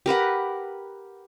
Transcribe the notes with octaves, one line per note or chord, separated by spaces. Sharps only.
G4 A#4 B4 F#5